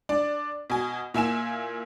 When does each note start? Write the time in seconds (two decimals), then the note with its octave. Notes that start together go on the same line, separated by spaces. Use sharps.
0.09 D4 D5
0.70 B2 G#5
1.14 A#2 E4 G#5 E7